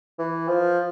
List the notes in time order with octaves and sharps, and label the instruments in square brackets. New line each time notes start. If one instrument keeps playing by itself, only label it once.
[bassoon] E3
F3